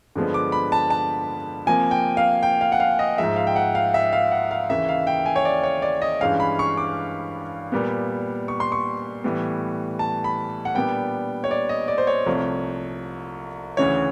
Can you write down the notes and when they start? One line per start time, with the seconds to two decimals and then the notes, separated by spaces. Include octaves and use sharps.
0.16 G2 D3 F3 G#3 B3
0.34 D6
0.52 B5
0.72 A5
0.90 A5
1.66 C3 F3 A#3 G#5
1.91 G5
2.17 F5
2.43 G5
2.61 F5
2.72 F#5
2.80 F5
2.99 D#5
3.18 G#2 F3 G#3 E5
3.36 F5
3.47 G5
3.56 F#5
3.75 F5
3.94 E5
4.13 F5
4.31 F#5
4.51 F5
4.70 D#2 C#3 E3 E5
4.89 F5
5.07 G5
5.26 G#5
5.36 C#5
5.45 D5
5.63 C#5
5.82 D5
6.02 D#5
6.21 G2 E3 G#3 C#4 F5
6.40 B5
6.59 C#6
6.77 D6
7.72 A#2 G3 B3
8.48 C#6
8.60 C6
8.72 C#6
9.24 A2 E3 G3 B3
9.99 A5
10.24 B5
10.65 F#5
10.75 A#2 G3 B3 D4 G5
11.44 C#5
11.51 D5
11.69 D#5
11.88 D5
11.98 C5
12.07 C#5
12.26 C2 C3 F3 A3
13.77 D2 C#3 E3 C#5